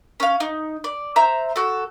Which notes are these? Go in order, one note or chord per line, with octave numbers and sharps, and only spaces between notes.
C#4 F5
D#4
D5
C5 E5 A#5 G6
F#4 A4